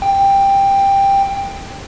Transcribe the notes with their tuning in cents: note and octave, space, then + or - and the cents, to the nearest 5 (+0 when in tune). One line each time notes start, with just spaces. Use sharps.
G5 +10